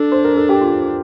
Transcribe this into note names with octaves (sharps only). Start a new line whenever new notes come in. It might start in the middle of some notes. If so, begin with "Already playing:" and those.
Already playing: D4 A4
C5
A#4
A4
G4
F4